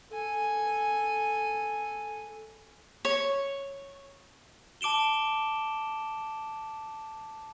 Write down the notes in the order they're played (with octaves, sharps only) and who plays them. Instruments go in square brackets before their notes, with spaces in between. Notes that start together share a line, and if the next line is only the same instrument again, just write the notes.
[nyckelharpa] A4 G#5
[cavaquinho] C#5
[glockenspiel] A5 D6 D7 E7 G7